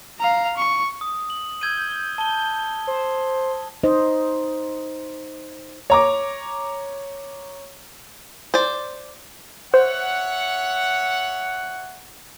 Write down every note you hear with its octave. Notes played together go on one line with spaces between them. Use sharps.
F5 A#5
C#6
D#6
F#7
E6 G6 G#6 D#7
A5 G7
C5
D#4 C5 D#5
C#5 A#5 D6
C5 D5
C5 C#5 E5 F#5